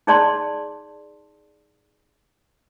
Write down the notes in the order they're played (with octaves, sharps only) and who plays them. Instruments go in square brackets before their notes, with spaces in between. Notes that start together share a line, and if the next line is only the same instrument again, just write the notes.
[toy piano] D#4 G#4 C#5 D5 A5 C6